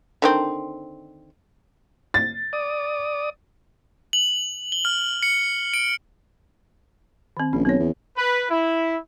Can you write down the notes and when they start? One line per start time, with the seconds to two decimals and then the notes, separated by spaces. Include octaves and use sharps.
0.22 D3 D#3 C4
2.14 A6
2.53 D5 D#6
4.13 F#7
4.72 G7
4.85 F6
5.23 C#7
5.74 D7
7.37 D#3 C4
7.53 A#1 C#4
7.65 B1 C4 C#5
7.79 E2
8.17 B4
8.50 E4